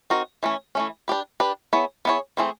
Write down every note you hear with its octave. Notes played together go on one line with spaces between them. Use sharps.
C4 D#4 F#4 A#4
E3 A3 C#4
E3 A3 C#4
D4 G4 B4
D4 G4 B4
B3 E4 G#4 C#5
B3 E4 G#4 C#5
E3 A3 C4 E4 G#4